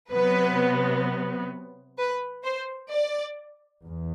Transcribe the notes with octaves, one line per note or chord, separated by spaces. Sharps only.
C3 F#3 B3 B4
B4
C5
D5
E2